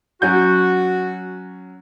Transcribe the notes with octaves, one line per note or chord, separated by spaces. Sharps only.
F#3 C#4 F#4 G6